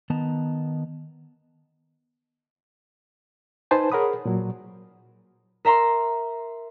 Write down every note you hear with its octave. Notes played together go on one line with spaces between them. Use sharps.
D#3 B3 D#5 A5 A#5
D#4 B4 C5 G#5 A5
G#4 A#4 C#5 F#5 B5 D#6
A#2 F#3
A#4 E5 A#5 C6